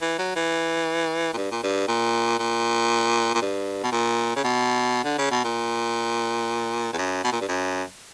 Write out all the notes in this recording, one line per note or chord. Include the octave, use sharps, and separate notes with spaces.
E3
F#3
E3
A#2
G2
A#2
G2
A#2
A#2
A#2
G2
B2
A#2
C#3
B2
D3
C#3
B2
A#2
E2
F#2
B2
A#2
G2
F#2